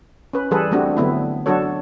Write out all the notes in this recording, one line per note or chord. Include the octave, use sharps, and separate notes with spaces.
C#4 B4
E3 G3 G#4 A4 B4
G3 A3 C4 D4 F#4
D3 F#3 A3 B3 C4 E4
F#3 D4 F#4 A4 C#5